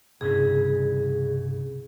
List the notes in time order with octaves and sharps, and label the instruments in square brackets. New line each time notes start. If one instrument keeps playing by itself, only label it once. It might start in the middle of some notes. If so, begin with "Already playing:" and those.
[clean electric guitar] C2 G2 C#3 [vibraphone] G#4